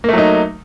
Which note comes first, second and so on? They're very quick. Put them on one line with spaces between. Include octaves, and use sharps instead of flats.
A#3 A3 F#3 D#4